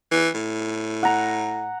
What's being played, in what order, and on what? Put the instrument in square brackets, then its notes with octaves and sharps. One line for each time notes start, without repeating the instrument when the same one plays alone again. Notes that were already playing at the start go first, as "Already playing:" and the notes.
[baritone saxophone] E3
A2
[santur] F#5 A#5